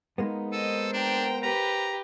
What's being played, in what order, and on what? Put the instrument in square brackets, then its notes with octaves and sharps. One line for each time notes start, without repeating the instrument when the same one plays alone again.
[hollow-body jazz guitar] G#3 A#3 B3 [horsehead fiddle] D#4
[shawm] A4 [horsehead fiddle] A#4 C5 [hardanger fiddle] D#5
[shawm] D4 [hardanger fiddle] G5 A#5
[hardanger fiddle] G4 B4 [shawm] A#5